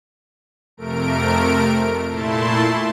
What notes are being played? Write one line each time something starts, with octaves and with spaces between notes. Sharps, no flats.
F2 C3 A3 A#4 D7
A#2 A3 E4 A5 C6